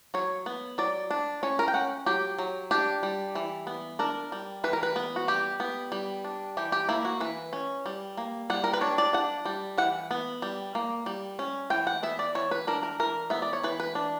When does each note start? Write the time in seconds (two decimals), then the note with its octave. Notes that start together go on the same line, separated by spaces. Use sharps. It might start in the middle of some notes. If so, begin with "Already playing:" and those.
0.14 F#3 C#5
0.46 B3
0.78 F#3 D5
1.10 D4
1.43 C#4 C#5
1.59 A#4
1.68 G5
1.74 C#4 F#5
2.06 F#3 G4
2.38 F#3
2.71 D4 G4
3.03 G3
3.35 E3
3.67 B3
3.99 D4 A#4
4.32 G3
4.64 E3 B4
4.73 A#4
4.83 B4
4.96 B3
5.16 F#4
5.28 G3 G4
5.60 B3
5.92 G3
6.24 D4
6.57 E3 G4
6.72 G4
6.89 A#3 E4
7.05 F#4
7.20 E3 B4
7.53 C#4
7.86 G3
8.17 A#3
8.50 G3 F#5
8.64 A#4
8.73 B4
8.81 D4 C#5
8.98 D5
9.13 D4 F#5
9.45 G3
9.78 E3 F#5
10.11 B3
10.42 G3
10.75 A#3
11.06 G3
11.39 C#4
11.70 E3 G5
11.87 F#5
12.03 B3 E5
12.19 D5
12.35 E3 C#5
12.51 B4
12.67 D4 A#4
12.83 A#4
13.00 E3 A#4
13.30 B3 E5
13.42 D5
13.53 C#5
13.63 E3 B4
13.80 B4
13.95 D4